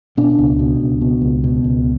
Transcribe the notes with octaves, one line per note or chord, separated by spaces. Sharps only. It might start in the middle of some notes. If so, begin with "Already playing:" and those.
B2 D4
C#2
B2
C#2
B2
C#2
B2
C#2